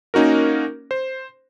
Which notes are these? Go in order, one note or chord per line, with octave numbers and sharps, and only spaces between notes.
A#3 C#4 D#4 F#4 A#4
C5